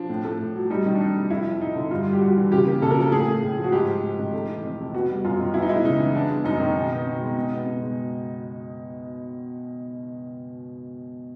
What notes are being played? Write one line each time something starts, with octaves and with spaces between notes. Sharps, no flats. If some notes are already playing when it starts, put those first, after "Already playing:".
Already playing: F3 D4
A2
A3
A2
F#3
G3 D#4
D#3
D4
F2 D#4
C3
F2 E4
F3
F2 D#4
D3
G2 F4
G3
G4
G2 F#4
E3
C#3 G4
A#3
C#3 A4
A#4
F3 A4
A2 G#4
A3
A2
F3
F#4
G#2 G4
G#3
G#2
D#3
A3
E3
F2
C3
B3 F#4
G3
F#2 F4
D#3
B3 E4
D#4
G#3 E4
C#3 D#4
E3
B3 D4
G#3
F#2 D#4
D#3
B2
B3
B2
G#3
B2
B3
B2
G#3